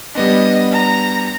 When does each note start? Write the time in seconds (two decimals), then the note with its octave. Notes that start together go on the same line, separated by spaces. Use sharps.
0.15 G3 B3 D4 D#5
0.72 A#5